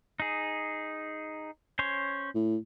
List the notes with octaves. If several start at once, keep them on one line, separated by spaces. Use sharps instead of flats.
D#4 G#4
C#4 C5 C#5
A2